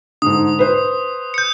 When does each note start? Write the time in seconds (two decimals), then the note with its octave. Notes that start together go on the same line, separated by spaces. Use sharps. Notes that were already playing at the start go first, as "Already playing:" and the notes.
0.22 G#2 D3 D#6
0.59 B4 C5
1.34 G6 C#7